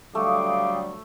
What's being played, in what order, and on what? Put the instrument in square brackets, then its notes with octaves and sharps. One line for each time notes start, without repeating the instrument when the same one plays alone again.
[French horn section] D3 F#3 G3 [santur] A3 [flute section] F5 G5 D#6 [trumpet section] D6